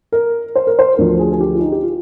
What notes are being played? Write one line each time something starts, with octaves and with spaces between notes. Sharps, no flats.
A#4
C5
A#4
C5
D2 D3 F3 A#4
G#4
G#4
G4
F4
D#4
G4
F4